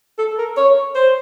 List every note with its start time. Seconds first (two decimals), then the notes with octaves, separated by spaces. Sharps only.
0.19 A4
0.38 A#4
0.57 C#5
0.95 C5